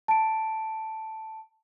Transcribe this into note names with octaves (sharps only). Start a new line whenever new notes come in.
A5 D7